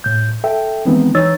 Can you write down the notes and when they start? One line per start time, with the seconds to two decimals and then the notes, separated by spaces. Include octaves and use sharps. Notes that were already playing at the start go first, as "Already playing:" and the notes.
0.04 A2 G6
0.44 A4 E5 G5
0.85 D#3 E3 G#3 B3 C4 D#4
1.15 E3 D#4 C#5 E6 A6